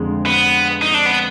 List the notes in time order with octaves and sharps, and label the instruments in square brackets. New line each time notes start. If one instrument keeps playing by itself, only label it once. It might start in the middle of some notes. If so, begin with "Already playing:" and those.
Already playing: [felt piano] F2 D3 G#3
[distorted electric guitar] B3
D#4
D4
B3